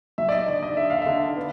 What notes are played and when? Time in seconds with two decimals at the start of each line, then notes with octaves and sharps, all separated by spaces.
0.18 F#3 E5
0.29 D5
0.32 D#5
0.47 D3 D5
0.63 D#5
0.77 D3 E5
0.90 F5
1.02 D3 E5
1.37 B3